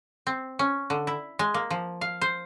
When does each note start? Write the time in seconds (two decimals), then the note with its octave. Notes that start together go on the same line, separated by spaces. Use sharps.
0.27 C4
0.59 C#4
0.90 D3
1.07 E4
1.39 G#3
1.54 A#3
1.71 F3
2.01 F5
2.21 C5